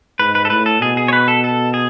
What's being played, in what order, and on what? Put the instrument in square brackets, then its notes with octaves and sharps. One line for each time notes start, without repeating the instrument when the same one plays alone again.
[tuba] G#2 [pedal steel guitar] B4
[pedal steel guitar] B4
A4
[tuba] A2 [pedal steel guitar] B4
[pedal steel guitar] A4
[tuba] B2 [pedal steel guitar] G#4
[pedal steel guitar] G#4
C#5
B4
A4
A4
G#4